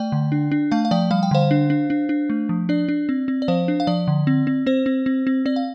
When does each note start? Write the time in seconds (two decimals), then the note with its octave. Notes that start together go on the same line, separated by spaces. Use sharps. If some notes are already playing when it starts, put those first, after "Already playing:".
Already playing: A3 D5 G5
0.12 D3
0.32 D4
0.52 D4
0.71 A3 F5 A5
0.85 F5
0.91 F3 D5 G5
1.11 G3 F5
1.23 G5
1.31 D3 C5 F5
1.51 D4
1.70 D4
1.90 D4
2.09 D4
2.30 A3
2.49 F3
2.69 D4 D5
2.88 D4
3.09 C4
3.28 C4
3.42 D5
3.48 F3 C5 F5
3.68 D4
3.80 F5
3.87 F3 D5
4.08 D3
4.27 C4
4.47 C4
4.66 C4 C5
4.86 C4
5.06 C4
5.27 C4
5.46 C4 D5
5.56 F5